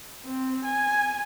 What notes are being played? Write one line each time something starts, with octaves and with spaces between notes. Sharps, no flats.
C4
G#5